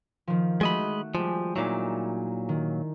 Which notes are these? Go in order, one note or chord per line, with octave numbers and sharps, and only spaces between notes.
D#3 F3
G#3 A3 F#4 D#5 B5
F3 G3 G#3
A#2 F#3 D#4 E4 D5
D#3